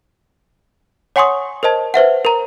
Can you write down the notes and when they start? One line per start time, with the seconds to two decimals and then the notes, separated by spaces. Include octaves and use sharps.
1.16 C#5 F#5 G#5 C6 C#6 D#6
1.63 A#4 C5 D#5 A5 G#6
1.94 B4 C5 E5 F#5
2.25 A#4 A#5